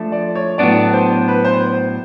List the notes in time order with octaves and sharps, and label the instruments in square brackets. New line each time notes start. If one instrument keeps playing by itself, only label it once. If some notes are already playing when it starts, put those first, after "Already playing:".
Already playing: [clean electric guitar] F3 A3 D4
[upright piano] D5
C#5
[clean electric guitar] A2 F#3 B3 D4 [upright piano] D5
[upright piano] C5
B4
C5